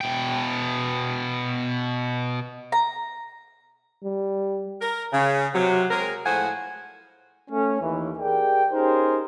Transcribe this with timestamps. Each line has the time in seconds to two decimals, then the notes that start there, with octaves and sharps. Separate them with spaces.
0.01 B2 G5
2.72 A#5
4.04 G3
4.81 A#4
5.13 C#3
5.55 C3 F#3
5.91 G#3 C4 G#4 A#4
6.26 A2 F3 G#3 C5 F#5 G#5
7.50 A3 C#4
7.82 D#2 E3
8.19 G4 G#4 A#4 D5 G5
8.73 C#4 D#4 G4 G#4 A#4 C5